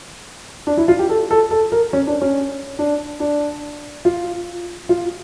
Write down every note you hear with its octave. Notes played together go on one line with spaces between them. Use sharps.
D4
E4
F4
G4
A4
A4
A4
A#4
C#4
D4
C#4
D4
D4
F4
F4